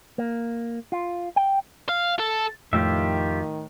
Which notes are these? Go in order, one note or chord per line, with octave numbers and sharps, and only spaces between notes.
A#3
F4
G5
F5
A4
F2 A2 D#3 F4 G4 E5